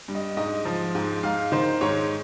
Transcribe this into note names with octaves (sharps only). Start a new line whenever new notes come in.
G2
D#5
G#2 D#5
F3
G#2
G#2 F5
D#3 C5
G#2 C#5